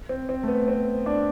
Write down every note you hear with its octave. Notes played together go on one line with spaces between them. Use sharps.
C4
C4
A3
B3
C4
D4